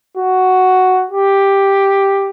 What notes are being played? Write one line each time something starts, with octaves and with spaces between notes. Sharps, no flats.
F#4
G4